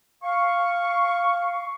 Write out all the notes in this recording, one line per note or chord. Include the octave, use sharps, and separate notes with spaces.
F5 C#6